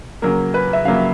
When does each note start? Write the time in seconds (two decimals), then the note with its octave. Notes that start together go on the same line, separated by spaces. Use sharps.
0.22 C#3 F#3 A#3 A#4
0.54 B4
0.73 E5
0.85 C#3 F#3 A#3 F5